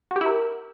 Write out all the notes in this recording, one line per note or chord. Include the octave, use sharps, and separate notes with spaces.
F#4
G4
E4
A#4